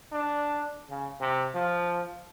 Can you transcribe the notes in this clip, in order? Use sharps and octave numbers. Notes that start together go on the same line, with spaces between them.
D4
C#3
C3
F3